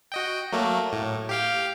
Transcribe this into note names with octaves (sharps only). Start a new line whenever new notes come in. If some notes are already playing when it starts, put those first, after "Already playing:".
F#4 D#5 G5
F#3 A3 A#3
A2
G4 F5 G5